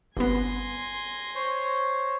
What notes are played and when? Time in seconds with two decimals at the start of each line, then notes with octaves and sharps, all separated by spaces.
0.17 G1 B3 G#5 C6 A#6
1.35 C5 C#5